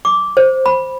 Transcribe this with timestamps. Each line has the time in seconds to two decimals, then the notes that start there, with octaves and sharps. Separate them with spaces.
0.05 D6
0.37 C5
0.66 B5